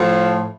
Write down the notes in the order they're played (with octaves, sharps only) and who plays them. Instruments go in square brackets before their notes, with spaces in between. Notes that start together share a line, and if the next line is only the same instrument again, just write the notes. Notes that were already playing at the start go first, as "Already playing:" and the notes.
Already playing: [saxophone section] A2 F3